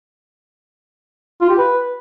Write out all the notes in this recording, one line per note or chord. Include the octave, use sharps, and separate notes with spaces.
F4
G4
B4